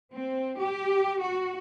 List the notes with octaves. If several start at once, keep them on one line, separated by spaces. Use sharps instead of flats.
C4
G4
F#4